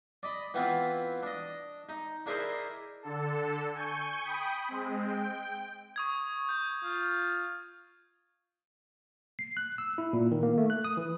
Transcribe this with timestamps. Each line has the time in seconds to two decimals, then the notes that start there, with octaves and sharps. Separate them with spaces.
0.23 D5 D#5 B5
0.54 E3 B3 C4 E4 F4
1.22 D4 D#5
1.89 D#4
2.26 D4 E4 G#4 A#4 C5 D#5
3.03 D3 A4
3.75 G#5 C#6 G6
4.24 G5 B5 D#6
4.69 G#3 C4
5.07 G5
5.96 C#6 D#6 G#6
6.49 C#6 G6
6.84 F4
9.39 C7
9.57 F#6
9.78 E6
9.98 E4
10.13 A#2
10.31 D#3
10.43 A#3
10.58 A3
10.70 F#6
10.85 D#6
10.97 E3